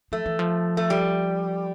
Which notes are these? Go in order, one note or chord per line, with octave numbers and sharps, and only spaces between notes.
F3 A3
E3
F3
A3
G3